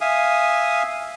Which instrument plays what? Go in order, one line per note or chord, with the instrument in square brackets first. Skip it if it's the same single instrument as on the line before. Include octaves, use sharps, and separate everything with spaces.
[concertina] E5 F5 G#5 D#6